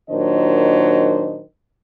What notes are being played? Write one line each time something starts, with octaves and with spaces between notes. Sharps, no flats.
A#2 D#3 F#3 D4 C5 D#5